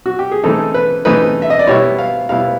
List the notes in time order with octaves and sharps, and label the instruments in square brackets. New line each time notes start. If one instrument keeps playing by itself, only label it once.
[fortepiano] F#4
G4
G#4
C#3 E3 A3 C4 D#4 A4
B4
C#3 E3 A3 C4 D#4 B4
E5
D#5
D5
B2 G3 B3 E4 C#5
F5
B2 G3 B3 E4 F5